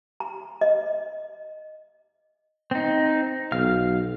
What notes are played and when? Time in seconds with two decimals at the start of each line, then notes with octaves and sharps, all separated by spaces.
0.20 A#5
0.61 D#5
2.71 C4 D#4
3.52 B1 F5 F6